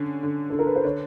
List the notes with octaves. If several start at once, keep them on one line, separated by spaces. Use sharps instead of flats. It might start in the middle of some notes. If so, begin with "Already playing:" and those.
Already playing: D3 C#4
D3
D3 A4
A#4
B4
C5
D3 C#5